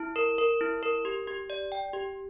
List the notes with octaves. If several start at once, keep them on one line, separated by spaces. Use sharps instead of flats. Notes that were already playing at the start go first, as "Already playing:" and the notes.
Already playing: E4
A#4
A#4
E4
A#4
G4
G4
D5
G5
G4